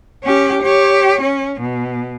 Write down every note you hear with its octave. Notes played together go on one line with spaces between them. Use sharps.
C#4 G4
G4 C#5
C#4
B2